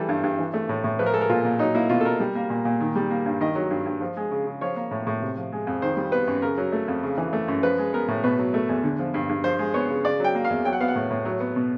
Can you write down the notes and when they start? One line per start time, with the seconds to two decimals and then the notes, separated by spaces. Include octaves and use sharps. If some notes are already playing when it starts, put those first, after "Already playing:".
Already playing: E3 G3 A4
0.09 G2
0.24 G2
0.39 E3
0.54 A3
0.69 A2
0.84 A2
0.99 F3 B4
1.06 A#4
1.14 G#3 A4
1.21 A#4
1.29 A#2 F4
1.45 A#2
1.59 F#3 D#4
1.75 A#3 E4
1.89 B2 F4
2.01 A4
2.05 B2 A#4
2.20 G3
2.35 A#3
2.50 A#2
2.65 A#2
2.80 D#3
2.96 G3
3.10 A#3
3.26 G2
3.41 D#3 D#5
3.55 F#3
3.71 G2
3.86 G2
4.01 F3
4.17 G#3
4.31 C#3
4.46 C#3
4.61 F3 C#5
4.76 A#3
4.91 A2
5.07 A2
5.22 C3
5.37 F3
5.52 G#3
5.67 F2
5.82 D#3 C5
5.97 G3
6.12 B3 B4
6.27 F#2
6.42 C#3 A#4
6.58 F#3
6.72 A3
6.88 F2
7.03 C#3
7.18 E3
7.33 A3
7.48 F#2
7.63 F3 B4
7.78 G#3
7.93 B3 A#4
8.08 A2
8.23 B2 B4
8.39 F#3
8.54 A3
8.69 E2
8.83 D3
8.99 F3
9.14 G2
9.29 G2
9.44 F3 C5
9.59 G#3
9.74 B3 C#5
9.89 C#3
10.05 C#3 D5
10.20 F#3 G5
10.35 A#3
10.45 F5
10.50 E2
10.65 F#3 G5
10.73 F#5
10.80 B3 F5
10.88 F#5
10.95 A2
11.10 A2
11.25 F#3
11.40 B3
11.56 B2